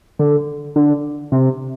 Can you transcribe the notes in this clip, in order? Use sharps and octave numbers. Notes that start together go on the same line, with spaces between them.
D3
D3
C3